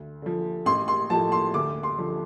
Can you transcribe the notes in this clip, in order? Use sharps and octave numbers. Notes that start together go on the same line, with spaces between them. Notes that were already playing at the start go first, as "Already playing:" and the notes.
Already playing: D2
D3 F3
A1 C6
C6
A2 F3 A5
C6
D2 D6
C6
D3 F3